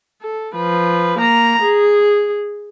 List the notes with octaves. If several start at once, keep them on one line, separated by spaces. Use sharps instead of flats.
A4
F3 B4
A#3 A#5
G#4